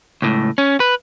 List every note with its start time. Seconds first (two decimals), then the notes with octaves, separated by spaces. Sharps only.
0.22 C#2 A2
0.58 C#4
0.80 B4